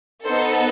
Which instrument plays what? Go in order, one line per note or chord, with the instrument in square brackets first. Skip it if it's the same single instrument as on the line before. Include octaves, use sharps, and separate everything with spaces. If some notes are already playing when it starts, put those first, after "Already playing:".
[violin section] B3 D#4 A4 C5